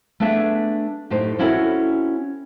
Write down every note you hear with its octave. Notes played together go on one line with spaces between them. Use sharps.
A3 B3 D4 G#4 E5
F#2 A2 A3 D#4 G4 C5
C4 C#4 E4 F#4 A4 A#4